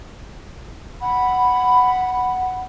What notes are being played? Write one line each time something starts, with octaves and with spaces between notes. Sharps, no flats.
F#5 B5